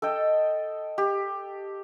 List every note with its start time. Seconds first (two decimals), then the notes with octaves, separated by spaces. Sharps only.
0.02 A4 D#5 G5
0.98 G4